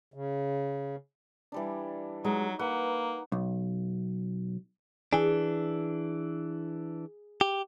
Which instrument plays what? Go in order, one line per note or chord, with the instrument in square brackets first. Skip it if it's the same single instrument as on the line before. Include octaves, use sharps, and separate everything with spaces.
[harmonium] C#3
[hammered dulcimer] E3 G3 D4
[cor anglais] F#3 [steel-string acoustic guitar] G#3 [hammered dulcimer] D#4
[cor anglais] A#3 [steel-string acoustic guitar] B4 [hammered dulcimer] F#5
[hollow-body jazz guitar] B1
[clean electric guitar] E3 D4 [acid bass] G#4
[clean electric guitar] G4